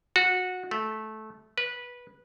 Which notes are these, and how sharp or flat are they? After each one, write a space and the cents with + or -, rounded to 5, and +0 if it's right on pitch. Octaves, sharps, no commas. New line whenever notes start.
F#4 -15
A3 -15
B4 -15